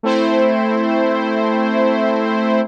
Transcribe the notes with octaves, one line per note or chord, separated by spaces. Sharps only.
A3 C4 E4 C5